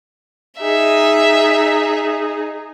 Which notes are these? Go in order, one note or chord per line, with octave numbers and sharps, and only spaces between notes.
D#4 G#4 E5